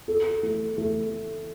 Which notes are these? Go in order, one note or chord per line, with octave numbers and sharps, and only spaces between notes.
A4
A3
A3